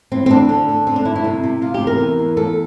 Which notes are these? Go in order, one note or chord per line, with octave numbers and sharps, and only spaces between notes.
E3 C4
C4
D2 D4
D3
D3
D3 C4
D4
G2 E4
E4
C3
C3
C3 F4
G4
E2
A#4
E3
E2
E2 A4